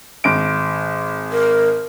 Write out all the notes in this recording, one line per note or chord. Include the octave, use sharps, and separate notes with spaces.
G#1 D7
A#4